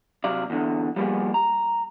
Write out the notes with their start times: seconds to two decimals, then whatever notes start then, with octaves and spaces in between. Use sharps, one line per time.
0.24 C3 F#3 D5 F5
0.50 E2 D3
0.96 F3 G3 A#3 B3 G#4
1.34 A#5